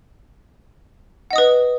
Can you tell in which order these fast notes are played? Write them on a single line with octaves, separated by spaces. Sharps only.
F#5 D#5 D#6 B4